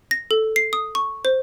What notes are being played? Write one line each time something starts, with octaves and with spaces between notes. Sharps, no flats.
A#6
A4
C7
D#6
C#6
C5